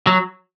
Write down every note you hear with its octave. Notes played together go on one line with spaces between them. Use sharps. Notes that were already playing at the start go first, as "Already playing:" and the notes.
F#3